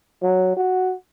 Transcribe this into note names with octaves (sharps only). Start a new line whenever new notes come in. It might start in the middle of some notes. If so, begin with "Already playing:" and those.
F#3
F#4